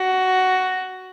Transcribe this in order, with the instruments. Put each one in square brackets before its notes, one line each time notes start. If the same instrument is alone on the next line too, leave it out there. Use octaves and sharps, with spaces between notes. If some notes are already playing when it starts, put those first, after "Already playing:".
Already playing: [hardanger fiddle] F#4